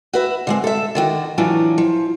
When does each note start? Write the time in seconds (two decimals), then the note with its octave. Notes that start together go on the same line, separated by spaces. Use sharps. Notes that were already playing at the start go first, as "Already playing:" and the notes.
0.13 F#4 B4 E5
0.47 D3 G#3 C4
0.64 A4 E5
0.95 D3 D#3 F#4
1.38 E3 F#3 C#4 D4 F4
1.78 F3